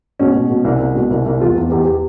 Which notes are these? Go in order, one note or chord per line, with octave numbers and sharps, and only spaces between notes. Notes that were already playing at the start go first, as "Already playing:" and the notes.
B2 C#4
B2
B2
C2
C2
B2
C2
C2
E2 F4
E2
E2 G4
G4